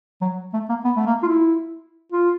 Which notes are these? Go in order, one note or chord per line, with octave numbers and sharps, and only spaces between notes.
F#3
A3
A#3
B3
A3
A#3
F4
E4
F4